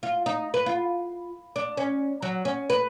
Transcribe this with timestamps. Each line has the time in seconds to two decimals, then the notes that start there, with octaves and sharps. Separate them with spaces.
0.03 F4
0.26 D#4
0.54 B4
0.66 F4
1.56 D4
1.77 C#4
2.22 F#3
2.45 C#4
2.70 B4